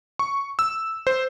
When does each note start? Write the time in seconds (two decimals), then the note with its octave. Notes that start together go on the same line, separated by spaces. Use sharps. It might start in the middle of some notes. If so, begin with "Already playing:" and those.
0.19 C#6
0.59 E6
1.07 C5